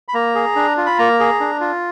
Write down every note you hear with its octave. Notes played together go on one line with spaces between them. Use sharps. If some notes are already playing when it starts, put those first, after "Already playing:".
B5
A#3 A#5
G#4
D4
F4
B5
A#3 A#5
G#4
D4
F4